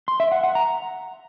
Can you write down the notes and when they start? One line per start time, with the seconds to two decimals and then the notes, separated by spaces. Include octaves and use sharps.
0.08 C6
0.20 E5
0.32 F#5
0.43 F#5
0.55 A#5